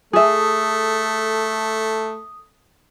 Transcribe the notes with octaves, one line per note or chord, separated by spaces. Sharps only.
A3 G#4 A4 E5 D#6